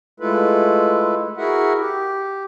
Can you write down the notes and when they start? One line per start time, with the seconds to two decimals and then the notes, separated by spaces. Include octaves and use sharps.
0.20 G#3 A3 E4 F4 A4 B4
1.37 E4 F#4 G#4 A#4 E5 F#5
1.79 G4